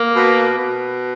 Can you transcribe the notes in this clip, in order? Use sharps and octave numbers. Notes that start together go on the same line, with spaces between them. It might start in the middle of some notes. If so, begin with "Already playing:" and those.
Already playing: A#3
B2
B2